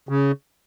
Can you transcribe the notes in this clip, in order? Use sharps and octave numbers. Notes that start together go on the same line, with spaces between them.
C#3